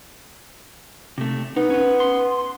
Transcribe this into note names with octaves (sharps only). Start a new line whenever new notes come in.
C3 A3
B3 D#4
C#4 B4
C6